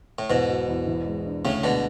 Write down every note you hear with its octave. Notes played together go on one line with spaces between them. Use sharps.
A2
E2 G#2 B2
F#3
E2
E3
G#3
D4
D2 A2 C#3
B2 D3 G#3